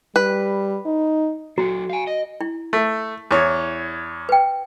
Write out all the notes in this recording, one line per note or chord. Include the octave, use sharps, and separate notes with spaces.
G3 B4
D#4
F#3 F#4 A4
F5 G#5
D#5
E4
A3
E2 E4 C#5 A5
B4 G5